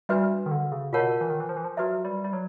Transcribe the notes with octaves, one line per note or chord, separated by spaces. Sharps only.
G3 D4 F#4 B4 E5
D#3
D3
C#3
B2 F4 A#4 C#5 F#5 A5
E3
D#3
E3
F3
E3
F3
F#3 F#4 B4 E5
G3
G3
F#3